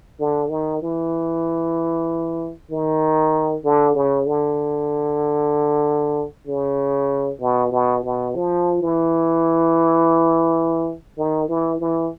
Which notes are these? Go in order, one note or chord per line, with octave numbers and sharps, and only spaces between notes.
D3
D#3
E3
D#3
D3
C#3
D3
C#3
B2
B2
B2
F3
E3
D#3
E3
E3